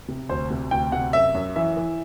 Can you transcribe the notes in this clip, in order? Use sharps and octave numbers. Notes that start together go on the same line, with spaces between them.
C3
D2 C5
C3
D2 G5
C3 F#5
F#2 E5
F#2
E3 E5
E3